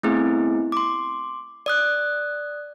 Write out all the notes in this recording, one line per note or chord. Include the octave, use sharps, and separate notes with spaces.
A3 B3 C4 E4 G#4
C6 D6
D5 D#6 F#6